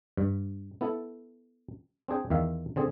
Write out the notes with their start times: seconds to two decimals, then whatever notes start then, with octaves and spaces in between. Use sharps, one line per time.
0.17 G2
0.81 B3 E4 A4
2.08 C4 D4 G#4 G5
2.30 E2 D#3 E5 F5
2.76 D3 C4 G#4